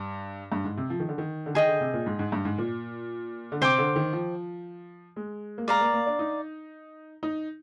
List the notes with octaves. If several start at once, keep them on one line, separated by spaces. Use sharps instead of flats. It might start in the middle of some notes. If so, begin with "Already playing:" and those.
Already playing: G2
G2
G#2
C3
F3
D#3
D3
D#3
D3
D#3 G#4 D#5 G5
D3
C3
A#2
G#2
G#2
G2
G#2
A#2
D3
C3 C5 G5 D6
D3
D#3
F3
G#3
A#3
G#3 D5 F5 A#5
A#3
A#3
D4
D#4
D#4